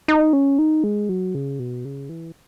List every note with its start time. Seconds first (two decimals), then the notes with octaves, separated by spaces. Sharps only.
0.08 D#4
0.33 C#4
0.59 D#4
0.84 G#3
1.09 F#3
1.35 C#3
1.59 B2
1.85 C#3
2.09 E3